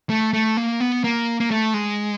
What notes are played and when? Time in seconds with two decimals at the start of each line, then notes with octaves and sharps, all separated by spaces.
0.10 A3
0.33 A3
0.57 A#3
0.80 B3
1.04 A#3
1.40 A#3
1.51 A3
1.74 G#3